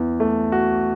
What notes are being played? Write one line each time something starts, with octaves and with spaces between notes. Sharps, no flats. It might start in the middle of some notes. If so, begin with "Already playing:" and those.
Already playing: E2 E3
A3
F#4